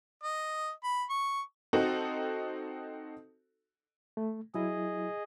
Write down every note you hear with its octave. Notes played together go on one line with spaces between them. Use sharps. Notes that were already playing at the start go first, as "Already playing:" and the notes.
D#5
B5
C#6
C4 D#4 F#4 A4
A3
F#3 E4 G#4 D#5